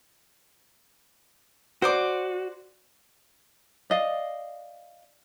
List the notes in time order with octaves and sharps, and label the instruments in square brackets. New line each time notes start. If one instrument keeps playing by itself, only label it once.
[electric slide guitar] F#4 [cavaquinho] C5 D5 D6
[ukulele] D5 D#5 F5